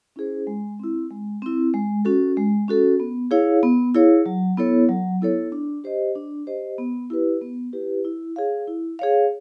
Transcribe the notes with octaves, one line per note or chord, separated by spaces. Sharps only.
C#4 E4 G#4 C5
G#3
C4 E4
G#3
C4 E4
G#3
C#4 F#4 A4
G#3
C#4 F#4 A4
B3
E4 G#4 C#5 F5
B3
E4 G#4 C#5 F5
F#3
B3 E4 A4 C#5
F#3
B3 E4 A4 C#5
D4
G4 C5 D#5
D4
G4 C5 D#5
B3
E4 G4 B4
B3
E4 G4 B4
E4
G#4 C#5 F5
E4
G#4 C#5 F5